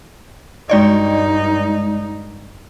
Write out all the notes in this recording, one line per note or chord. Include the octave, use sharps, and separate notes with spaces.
G2 G#3 D#4 D5 D#5